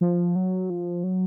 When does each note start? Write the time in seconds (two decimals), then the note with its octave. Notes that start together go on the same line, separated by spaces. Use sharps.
0.01 F3
0.36 F#3
0.70 F3
1.03 F#3